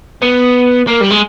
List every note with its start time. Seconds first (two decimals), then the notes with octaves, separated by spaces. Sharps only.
0.22 B3
0.87 A#3
1.01 G3
1.11 G#3